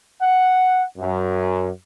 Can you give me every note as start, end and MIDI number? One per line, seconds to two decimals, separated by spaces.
0.22 0.83 78
0.98 1.68 42